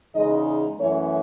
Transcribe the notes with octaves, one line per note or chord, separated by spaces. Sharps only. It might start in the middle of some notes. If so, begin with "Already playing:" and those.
E2 C#3 G#3 D#4 D#5
F#2 E3 A3 C#4 C#5